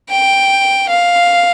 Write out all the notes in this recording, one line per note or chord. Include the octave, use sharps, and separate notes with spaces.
G5
F5